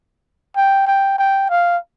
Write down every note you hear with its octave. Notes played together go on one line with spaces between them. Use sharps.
G5
G5
G5
F5